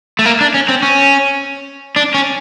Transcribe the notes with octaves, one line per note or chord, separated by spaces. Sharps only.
A3
A#3
D4
C#4
C4
C#4
D4
C#4